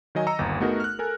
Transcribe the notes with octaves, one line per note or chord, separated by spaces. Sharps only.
D#3 F#3 D#5 G#5
D#5 A#5 E6 C#7
G1 D#2
A3 B3 D#4 F#4 G#4 A#4
F6 F#6
A4 A#4 G#5